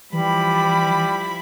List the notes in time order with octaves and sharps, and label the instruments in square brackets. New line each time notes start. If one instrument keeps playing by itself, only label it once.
[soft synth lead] E3 [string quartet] F3 E4 B5 [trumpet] G3